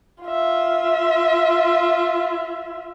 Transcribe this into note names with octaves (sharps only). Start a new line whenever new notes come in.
F4 E5